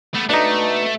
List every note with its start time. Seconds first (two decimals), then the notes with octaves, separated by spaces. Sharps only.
0.15 A3 B3
0.29 B2 A3 D4 D#4